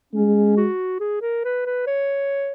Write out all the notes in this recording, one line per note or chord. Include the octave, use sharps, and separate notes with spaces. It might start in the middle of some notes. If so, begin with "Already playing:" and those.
G#3 C#4
F#4
G#4
A#4
B4
B4
C#5